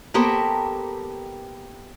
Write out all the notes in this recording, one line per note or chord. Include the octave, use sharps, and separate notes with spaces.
A#3 B3 G4 A4 A#4 C5